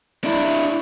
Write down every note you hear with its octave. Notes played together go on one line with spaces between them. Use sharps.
D4 E4